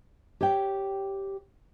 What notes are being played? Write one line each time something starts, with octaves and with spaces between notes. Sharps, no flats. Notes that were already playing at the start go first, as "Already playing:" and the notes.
G4 C#5 E5 G5